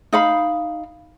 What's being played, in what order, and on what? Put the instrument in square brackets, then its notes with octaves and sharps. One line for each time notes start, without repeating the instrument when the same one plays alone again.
[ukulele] D#4 F5 B5